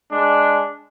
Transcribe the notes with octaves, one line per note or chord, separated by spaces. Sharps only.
G#3 D4